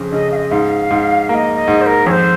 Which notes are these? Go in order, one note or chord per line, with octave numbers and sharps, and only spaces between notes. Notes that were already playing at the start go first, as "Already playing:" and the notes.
Already playing: F2 C#3
C#3 D#5
F5
D#5
G#2 F5
G#2
A#3 F5
D#5
D#5
G#2
C5
A#4
F2 C5 C#5